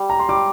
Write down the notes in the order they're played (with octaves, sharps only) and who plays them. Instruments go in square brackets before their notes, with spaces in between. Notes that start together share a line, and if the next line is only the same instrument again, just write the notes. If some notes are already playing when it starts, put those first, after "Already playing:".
Already playing: [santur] G3
[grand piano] A#5
C6
[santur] G3 [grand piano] D6